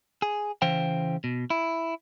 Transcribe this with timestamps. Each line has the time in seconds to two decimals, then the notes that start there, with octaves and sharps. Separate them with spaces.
0.22 G#4
0.62 C#3 E3 C5 F5 G5
1.24 B2
1.50 E4